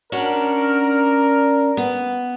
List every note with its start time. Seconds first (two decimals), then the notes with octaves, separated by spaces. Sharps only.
0.12 C#4 D4 F#4 A#4 D5
1.77 B3